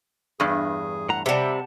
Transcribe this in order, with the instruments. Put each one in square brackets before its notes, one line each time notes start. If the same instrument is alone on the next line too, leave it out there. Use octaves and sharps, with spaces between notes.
[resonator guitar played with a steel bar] E2 G2 [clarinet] G#4
[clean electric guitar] A2 A#5 [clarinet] F#5
[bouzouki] C3 G3 [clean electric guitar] G4 F#5 A5 [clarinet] E5